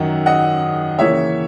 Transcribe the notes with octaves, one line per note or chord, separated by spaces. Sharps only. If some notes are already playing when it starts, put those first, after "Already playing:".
Already playing: F#2 D#3 F#3 F#5
D#5 F#5
C#3 E3 A#3 C#4 C#5 E5